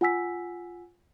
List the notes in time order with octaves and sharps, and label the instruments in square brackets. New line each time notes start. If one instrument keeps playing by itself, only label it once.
[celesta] F4 F#5 G#5 E6 B6